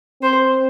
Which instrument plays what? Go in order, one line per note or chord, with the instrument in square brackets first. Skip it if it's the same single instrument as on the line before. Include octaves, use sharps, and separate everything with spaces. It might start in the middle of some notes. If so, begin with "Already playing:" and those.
[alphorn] C4 [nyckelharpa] C5